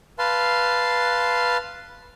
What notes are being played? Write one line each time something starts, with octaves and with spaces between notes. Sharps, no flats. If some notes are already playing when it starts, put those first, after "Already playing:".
B4 F5 A5 C6